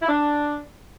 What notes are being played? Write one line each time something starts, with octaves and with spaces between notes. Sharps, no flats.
E4
D4